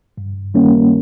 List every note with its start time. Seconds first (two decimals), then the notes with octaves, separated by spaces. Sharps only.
0.18 G2
0.54 D#3 G3 A#3 C#4